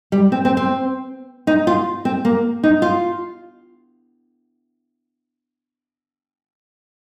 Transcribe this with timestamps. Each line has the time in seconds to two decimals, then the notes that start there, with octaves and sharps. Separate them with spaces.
0.12 G3
0.32 C4
0.45 C4
0.57 C4
1.47 D#4
1.67 F4
2.05 C4
2.25 A#3
2.63 D#4
2.82 F4